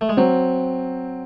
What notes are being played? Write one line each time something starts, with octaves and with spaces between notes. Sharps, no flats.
A3
G#3
F#3 C4